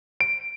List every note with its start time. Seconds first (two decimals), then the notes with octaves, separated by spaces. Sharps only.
0.21 D7